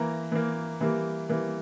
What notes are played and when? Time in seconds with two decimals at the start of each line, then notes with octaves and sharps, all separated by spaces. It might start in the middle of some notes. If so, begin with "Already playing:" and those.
Already playing: E3 A#3 A#5
0.32 E3 A#3
0.81 E3 G3 A#3
1.29 E3 G3 A#3